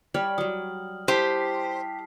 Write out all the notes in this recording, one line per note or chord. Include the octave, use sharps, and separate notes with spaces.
G3 C#5 D5 F6 F#7
F#3 G3 D#6
E4 G4 C5 A5 B6 C7